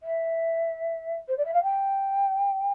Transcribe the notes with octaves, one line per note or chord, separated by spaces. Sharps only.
E5
C5
D5
E5
F5
G5